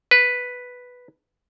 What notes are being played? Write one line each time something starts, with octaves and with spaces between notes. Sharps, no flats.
B4